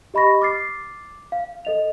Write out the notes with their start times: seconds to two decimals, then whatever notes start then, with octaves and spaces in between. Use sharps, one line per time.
0.14 G4 D#5 B5 C#6 A#6
0.41 D6 F6 A6 C7
1.32 F5
1.65 A4 D#5 F7